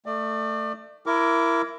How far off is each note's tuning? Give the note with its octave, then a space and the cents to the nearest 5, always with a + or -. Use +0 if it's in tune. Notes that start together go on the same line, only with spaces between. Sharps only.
A3 +15 D5 +35
E4 +20 A#4 +0 D6 -25